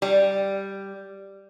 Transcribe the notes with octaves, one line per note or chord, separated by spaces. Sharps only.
G3